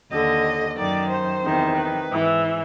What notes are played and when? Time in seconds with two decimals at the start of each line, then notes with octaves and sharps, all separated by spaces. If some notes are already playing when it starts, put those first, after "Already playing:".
0.12 D#2 D3 D#5
0.77 F#2 D#3 D5
1.10 C5
1.42 E2 C3 D#3
1.76 B4
2.08 G#2 E3